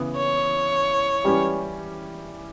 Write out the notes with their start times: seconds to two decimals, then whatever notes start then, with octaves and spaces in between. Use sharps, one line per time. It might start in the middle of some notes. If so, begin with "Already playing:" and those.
Already playing: C#3 E3 B3
0.17 C#5
1.24 E3 G3 C#4 G4